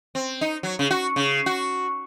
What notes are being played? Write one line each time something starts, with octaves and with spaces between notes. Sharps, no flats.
C4
D#4
F#3
C#3
F#4
C#3
F#4